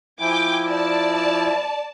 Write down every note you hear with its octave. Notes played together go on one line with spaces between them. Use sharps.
F3 E4 G5 G#5 D6
D5 A5